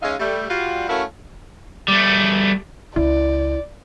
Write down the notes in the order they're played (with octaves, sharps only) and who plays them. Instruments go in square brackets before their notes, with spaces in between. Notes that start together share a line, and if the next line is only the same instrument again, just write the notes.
[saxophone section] G#3 C#4 D#4 E5 F5
G3 A3
G3 F4 F#4
A3 C#4 E4 F#4 A#4 F5
[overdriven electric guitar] G3 A3
[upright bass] C#2 C#3 [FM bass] E4 [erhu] D5